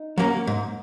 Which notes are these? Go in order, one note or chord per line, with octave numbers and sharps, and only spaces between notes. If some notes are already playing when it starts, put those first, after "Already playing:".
Already playing: D#4
F#3 A#3 C#4
G#2